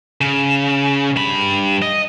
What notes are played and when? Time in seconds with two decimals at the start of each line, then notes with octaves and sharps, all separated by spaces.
0.21 C#3
1.16 G2 B5
1.82 D#5